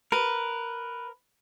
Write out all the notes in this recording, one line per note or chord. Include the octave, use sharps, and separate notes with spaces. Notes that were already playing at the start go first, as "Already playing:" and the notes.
A#4 B4